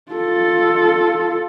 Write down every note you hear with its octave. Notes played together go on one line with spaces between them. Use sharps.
F4 A4